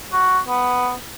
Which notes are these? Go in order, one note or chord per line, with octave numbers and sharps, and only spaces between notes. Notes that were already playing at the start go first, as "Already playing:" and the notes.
F#4
B3